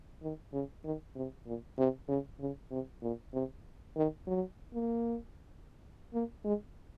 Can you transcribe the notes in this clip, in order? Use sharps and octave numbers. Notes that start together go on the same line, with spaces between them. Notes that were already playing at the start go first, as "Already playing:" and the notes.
D#3
C#3
D#3
C3
A#2
C3
C#3
C#3
C3
A#2
C3
D#3
F#3
A#3
A#3
G#3